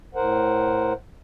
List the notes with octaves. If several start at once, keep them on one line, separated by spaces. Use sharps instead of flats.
A2 A#4 C5 F#5